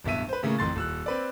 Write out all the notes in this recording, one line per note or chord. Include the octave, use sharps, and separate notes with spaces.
D1 G2 B2 E5 D#7
B4 C5
A2 C#3 A3 A#3
A1 F2 C6 A6
D#1 E6 F#6
C4 B4 D5